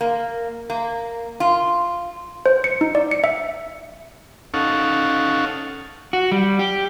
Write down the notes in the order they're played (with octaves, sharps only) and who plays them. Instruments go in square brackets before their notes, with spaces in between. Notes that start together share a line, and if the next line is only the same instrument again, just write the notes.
[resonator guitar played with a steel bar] A#3
A#3
F4
[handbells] C5
C#7
D#4
D5
C#7
E5
[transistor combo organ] C#4 D#4 A4 F5 F#5 C#6
[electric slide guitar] F#4
G3
G4